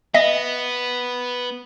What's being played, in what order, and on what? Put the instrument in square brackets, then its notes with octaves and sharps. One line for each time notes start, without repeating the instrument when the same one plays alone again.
[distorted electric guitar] B3 [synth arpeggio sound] D#5 E5